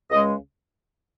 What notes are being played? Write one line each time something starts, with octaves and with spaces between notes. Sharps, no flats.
C#2 C#3 G#3 D#5